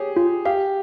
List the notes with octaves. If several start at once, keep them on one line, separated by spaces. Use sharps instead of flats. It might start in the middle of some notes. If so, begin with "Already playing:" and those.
Already playing: G4 G#4 C#5
F4
G4 F5